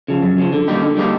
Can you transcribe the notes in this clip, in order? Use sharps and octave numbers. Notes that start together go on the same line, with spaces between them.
C#3 F3
F#2
C#3 F3
D3
G3 A#3 D#4 G4
D3
G3 A#3 D#4 G4